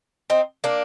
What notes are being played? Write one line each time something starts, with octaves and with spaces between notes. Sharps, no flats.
C4 D#4
A#3 D4